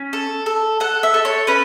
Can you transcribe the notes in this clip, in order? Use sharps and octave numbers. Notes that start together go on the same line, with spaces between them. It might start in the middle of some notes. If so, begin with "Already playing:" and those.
Already playing: C#4
A4
A4
A4 F#5
E5
A4
C#5
C#4 B4